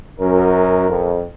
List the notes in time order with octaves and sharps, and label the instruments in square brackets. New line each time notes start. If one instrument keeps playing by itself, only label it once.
[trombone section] F#2 [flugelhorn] A#4
[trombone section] F2